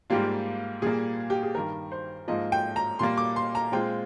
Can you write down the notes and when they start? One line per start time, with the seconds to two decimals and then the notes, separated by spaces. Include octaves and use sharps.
0.10 G#2 G3 A#3 F4 G4
0.82 A#2 G3 A#3 G#4
1.30 G4
1.43 G#4
1.55 G2 D#3 G3 A#4
1.92 C5
2.28 G#2 F3 A#3 F4 D#5
2.52 G5
2.76 A#5
2.99 A#2 G3 A#3 C6
3.17 D6
3.36 C6
3.55 A#5
3.72 A#2 G#3 C4 F4 G5